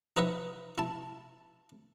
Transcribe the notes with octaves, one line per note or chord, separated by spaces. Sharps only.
D#4 B4 D#5 E5 F#5
E4 A5